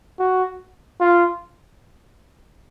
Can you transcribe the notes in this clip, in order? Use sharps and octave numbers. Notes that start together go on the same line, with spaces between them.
F#4
F4